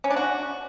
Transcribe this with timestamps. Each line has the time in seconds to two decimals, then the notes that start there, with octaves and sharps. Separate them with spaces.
0.04 C#4
0.10 D4
0.17 F#4